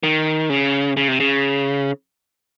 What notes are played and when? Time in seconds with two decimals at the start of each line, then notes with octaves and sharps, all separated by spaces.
0.03 D#3
0.50 C#3
0.97 C#3
1.08 C3
1.20 C#3